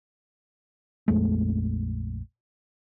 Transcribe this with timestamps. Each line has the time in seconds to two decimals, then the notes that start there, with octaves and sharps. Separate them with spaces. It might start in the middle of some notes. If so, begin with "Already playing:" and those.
1.08 A#1 F2 G#3 A3